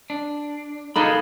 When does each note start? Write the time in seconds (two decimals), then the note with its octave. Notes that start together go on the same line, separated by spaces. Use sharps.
0.10 D4
0.96 A#3 D#4 G#4 A4 B4 B5